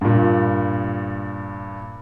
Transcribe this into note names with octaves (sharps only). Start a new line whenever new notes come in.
G2 A#2